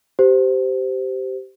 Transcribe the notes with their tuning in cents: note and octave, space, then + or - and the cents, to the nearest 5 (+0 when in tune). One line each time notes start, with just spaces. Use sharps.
G4 -15 C5 -20